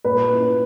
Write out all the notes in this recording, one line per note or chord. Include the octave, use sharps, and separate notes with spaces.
A#2 B4
A#3 C#4 E4